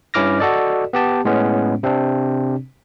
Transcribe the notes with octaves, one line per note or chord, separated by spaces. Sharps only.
G2 C#4 E4 D6 F6 A#6
F#4 A4 D5 D#5
B3 G4 A5
A2 G#3 B3 C#4
C3 C4 D4